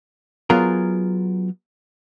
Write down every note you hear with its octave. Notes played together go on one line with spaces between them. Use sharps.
F#3 B3 F4 G#4 A#4